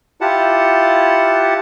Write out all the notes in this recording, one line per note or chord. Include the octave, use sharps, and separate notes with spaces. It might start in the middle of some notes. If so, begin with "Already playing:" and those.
E4 F4 G4 F#5 A5